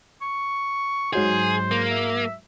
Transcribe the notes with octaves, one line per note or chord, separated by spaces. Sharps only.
C#6
G#2 F#3 G#3 G#4 C5
A#3
E5